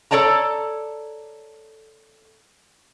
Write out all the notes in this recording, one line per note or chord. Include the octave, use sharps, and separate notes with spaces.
A4 C#5 D5 A5 A#5